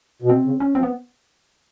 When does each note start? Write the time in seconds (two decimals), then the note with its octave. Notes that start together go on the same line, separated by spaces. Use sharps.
0.22 B2
0.30 C3 C4
0.45 C#3
0.60 C#4
0.75 F3 C4
0.83 B3